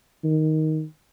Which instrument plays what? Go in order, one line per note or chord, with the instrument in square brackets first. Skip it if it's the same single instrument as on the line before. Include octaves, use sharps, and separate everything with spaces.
[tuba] D#3